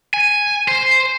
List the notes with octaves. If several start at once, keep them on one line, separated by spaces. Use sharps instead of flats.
G#5
C5